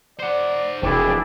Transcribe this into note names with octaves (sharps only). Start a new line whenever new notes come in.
C5 D5 F#5
E1 C3 A3 D4 E4 G#4 G5